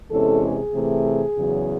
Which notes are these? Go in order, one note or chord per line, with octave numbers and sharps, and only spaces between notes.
E2 C3 E3 G#3 C#4 A4
G#4
C3 E3 A3
E2 C#3 F#3